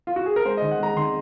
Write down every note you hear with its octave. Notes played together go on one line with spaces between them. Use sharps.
F4
F#4
G#4
A#4
G#3 C5
D#3 D#5
F#5
G#3 A#5
D#3 C6